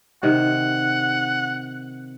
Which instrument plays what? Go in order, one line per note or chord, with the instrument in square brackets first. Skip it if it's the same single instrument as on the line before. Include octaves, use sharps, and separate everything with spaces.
[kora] C3 D#3 [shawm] F#5